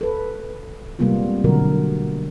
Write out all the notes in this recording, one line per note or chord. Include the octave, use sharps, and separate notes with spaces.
A4 B4
C3 G3 G#3 A#3 B3 F4
B2 D3 F#3 F#4 A#4